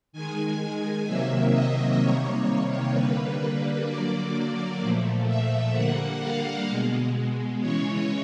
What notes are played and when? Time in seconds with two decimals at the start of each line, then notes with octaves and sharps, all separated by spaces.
0.13 D#3 G#3 G#5
1.06 C3 D#3 F#3 A#3 E5
1.52 D#5
2.00 C3 D#3 G3 A#3 C#5
2.93 D3 G3 A#3 B4
3.87 D3 F#3 A#3 D5
4.81 A#2 F3 A3
5.27 E5
5.74 D3 G3 A#3 F#5
6.21 F5
6.68 B2 G#3
7.61 C#3 E3 G#3 C#5